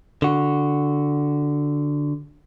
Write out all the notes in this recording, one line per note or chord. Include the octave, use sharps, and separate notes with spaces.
D3 F#4